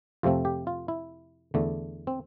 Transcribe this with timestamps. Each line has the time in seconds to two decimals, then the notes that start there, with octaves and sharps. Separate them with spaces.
0.23 F2 C3 F3 A3 C4 F4
0.45 G4
0.67 F4
0.88 E4
1.54 E2 D3 A3
2.07 C4